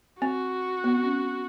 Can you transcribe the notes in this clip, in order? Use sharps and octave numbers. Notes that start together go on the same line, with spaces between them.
C4 F#4
B3
C4
C#4